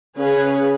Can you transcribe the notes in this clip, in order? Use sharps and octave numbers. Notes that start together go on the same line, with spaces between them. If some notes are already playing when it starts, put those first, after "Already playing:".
C#3 C#4 G#4 B4